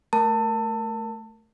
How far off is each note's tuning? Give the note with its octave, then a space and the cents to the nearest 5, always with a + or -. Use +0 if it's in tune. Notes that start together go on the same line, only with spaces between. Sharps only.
A3 +0 A#4 +5 A5 +25